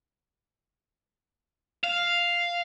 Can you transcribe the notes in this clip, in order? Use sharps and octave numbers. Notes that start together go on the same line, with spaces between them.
F5